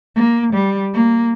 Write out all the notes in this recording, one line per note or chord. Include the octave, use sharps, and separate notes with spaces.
A#3
G3
A#3